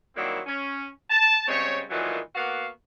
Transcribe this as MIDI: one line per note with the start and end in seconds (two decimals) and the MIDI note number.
0.16 0.40 51
0.16 0.40 54
0.16 0.40 55
0.16 0.40 58
0.16 0.40 60
0.16 0.40 64
0.47 0.88 61
1.10 1.46 81
1.48 1.83 49
1.48 1.83 55
1.48 1.83 56
1.48 1.83 60
1.48 1.83 73
1.90 2.19 46
1.90 2.19 51
1.90 2.19 52
1.90 2.19 54
1.90 2.19 56
1.90 2.19 57
2.35 2.68 58
2.35 2.68 59
2.35 2.68 66
2.35 2.68 77